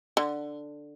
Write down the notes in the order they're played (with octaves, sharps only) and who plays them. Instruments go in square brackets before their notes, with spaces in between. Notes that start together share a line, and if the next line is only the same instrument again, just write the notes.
[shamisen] D3